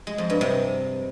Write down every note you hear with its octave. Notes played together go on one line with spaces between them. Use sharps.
G#3
F2
G2
C3